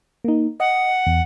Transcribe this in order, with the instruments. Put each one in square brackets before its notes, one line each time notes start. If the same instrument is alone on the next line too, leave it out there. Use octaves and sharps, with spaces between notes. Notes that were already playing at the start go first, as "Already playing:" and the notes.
[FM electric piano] A#3 D#4
[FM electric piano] D#5 [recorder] F#5
[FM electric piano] E2